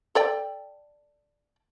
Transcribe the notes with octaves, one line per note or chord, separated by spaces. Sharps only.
A4 D5 G5